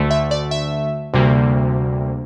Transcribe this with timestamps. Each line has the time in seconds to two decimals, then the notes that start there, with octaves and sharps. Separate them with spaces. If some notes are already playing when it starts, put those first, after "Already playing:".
Already playing: D2 D3 A3
0.11 E5
0.31 D5
0.51 E5
1.14 D2 C3 G3 A#3